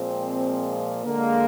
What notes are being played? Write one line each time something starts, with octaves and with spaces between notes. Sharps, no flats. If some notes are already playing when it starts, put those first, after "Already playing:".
Already playing: A#2 F3 G#3 C4
D3 G#3 A#3